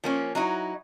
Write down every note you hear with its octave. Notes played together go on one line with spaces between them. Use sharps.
F3 A#3 C#4
F#3 D#4 E4